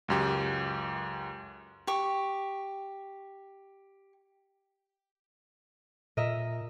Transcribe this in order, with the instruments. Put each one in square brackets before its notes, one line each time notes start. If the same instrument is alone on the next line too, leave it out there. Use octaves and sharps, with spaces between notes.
[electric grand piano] C#2 F#2 G4
[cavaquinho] G4 C#6
[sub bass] A#2 [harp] A#4 D#5 E5